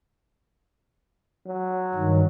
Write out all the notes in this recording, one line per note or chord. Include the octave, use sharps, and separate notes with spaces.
F#3
G2 D#3